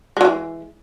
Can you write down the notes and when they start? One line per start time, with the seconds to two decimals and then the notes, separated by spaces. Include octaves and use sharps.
0.17 G#3
0.21 F#3
0.25 E3